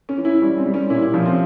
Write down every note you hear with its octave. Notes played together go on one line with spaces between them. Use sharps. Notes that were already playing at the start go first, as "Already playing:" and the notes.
C#4
E3
E4
G3 C#4
C4
G3
C#4
A#2 E4
E4
F3 C#4
C4